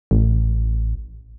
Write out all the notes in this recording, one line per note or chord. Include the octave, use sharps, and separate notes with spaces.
A1